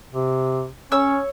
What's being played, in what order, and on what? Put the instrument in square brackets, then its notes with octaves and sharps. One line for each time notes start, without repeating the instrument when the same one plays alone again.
[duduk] C3
[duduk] C#4 [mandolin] C#5 E6